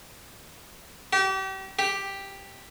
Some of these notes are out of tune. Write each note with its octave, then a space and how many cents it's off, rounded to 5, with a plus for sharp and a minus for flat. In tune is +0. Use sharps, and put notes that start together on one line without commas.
G4 -35
G4 +5